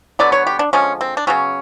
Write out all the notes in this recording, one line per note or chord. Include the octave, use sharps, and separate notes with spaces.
D3 F#3 B3 D5
C#5
G4
D4
D3 F3 G#3 C#4
C4
D4
C#3 F#3 B3 C#4